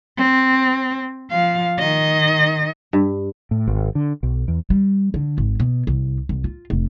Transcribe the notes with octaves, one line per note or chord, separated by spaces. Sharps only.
C4
F3 F5
D#3 D#5
G2
A2
G#1
D3
B1
E2
G3
D3
G#1
B2
C2
C2
F4
F1